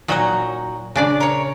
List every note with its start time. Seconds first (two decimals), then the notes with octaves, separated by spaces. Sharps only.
0.08 A#2 F#3 D#4 F#4 A#5
0.96 C#3 D4 D5
1.20 A#4 C#5